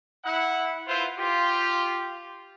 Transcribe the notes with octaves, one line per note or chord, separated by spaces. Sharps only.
E4 F#5
E4 F4 B4 C5
F4 G4